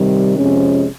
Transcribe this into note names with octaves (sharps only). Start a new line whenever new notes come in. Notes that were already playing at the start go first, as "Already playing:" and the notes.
Already playing: C3 D#3 G3
F2 C3 F3 G#3 C#4